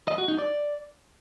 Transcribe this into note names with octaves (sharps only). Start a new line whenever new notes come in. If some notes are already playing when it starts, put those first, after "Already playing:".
D#5
F#4
D#4
D5